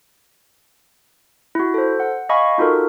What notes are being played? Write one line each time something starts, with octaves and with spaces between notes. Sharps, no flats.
E4 F#4
A4 C5
F#5
D#5 F5 G#5 B5 C#6
D#4 F4 F#4 A4 A#4